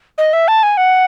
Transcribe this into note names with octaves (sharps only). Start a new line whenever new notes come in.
D#5
E5
A5
G#5
F#5